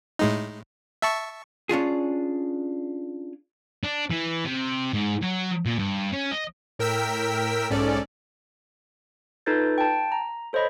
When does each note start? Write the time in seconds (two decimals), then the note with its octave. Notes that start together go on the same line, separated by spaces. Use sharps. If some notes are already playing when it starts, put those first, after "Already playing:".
0.19 A2 G#3 D#4
1.02 E5 A5 C#6
1.69 C#4 D4 F4 G#4
3.84 D4
4.11 E3
4.46 C3
4.93 G#2
5.22 F#3
5.66 A#2
5.79 G2
6.13 C#4
6.32 D#5
6.79 A2 A#4 G5 E6 B6
7.70 B1 G#2 C#4 A4 D5
9.46 D#4 F4 A4 B4 G6 A6
9.78 G5 A5
10.12 A#5
10.53 A4 C5 C#5 D#5 B5